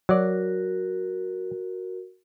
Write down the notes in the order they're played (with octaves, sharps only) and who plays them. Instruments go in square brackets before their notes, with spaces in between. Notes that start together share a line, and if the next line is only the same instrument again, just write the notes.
[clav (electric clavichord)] F#3 D5 [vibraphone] F#4 A#4